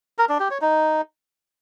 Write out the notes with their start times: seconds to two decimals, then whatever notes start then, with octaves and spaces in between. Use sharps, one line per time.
0.18 A#4
0.29 D4
0.40 G4
0.51 C#5
0.61 D#4